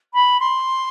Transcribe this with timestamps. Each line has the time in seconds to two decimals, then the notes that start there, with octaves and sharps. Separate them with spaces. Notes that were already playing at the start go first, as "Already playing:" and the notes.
0.13 B5
0.39 C6